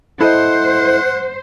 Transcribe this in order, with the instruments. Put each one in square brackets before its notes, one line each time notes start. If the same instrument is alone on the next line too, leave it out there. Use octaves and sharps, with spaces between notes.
[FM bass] E4 [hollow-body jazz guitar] A4 D#5 [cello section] C5 [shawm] F#5